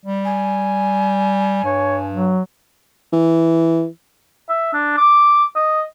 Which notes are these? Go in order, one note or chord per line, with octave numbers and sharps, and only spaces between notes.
G3
G#5
G2 C#5
F#3
E3
E5
D4
D6
D#5